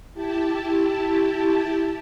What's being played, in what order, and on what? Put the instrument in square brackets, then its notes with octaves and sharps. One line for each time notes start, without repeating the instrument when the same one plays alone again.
[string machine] E4 G4 A5